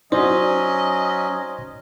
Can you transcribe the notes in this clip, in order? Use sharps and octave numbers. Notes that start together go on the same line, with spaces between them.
F#3 C#4 D#4 F#4 C5 D5 D#5 C6